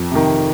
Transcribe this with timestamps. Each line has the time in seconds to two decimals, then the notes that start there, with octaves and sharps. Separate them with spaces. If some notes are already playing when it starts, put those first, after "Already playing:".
Already playing: F2
0.11 C3 D#3